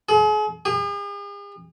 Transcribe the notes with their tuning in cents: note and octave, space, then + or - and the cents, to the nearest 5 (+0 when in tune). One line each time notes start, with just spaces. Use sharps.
G#4 +40
G#4 -45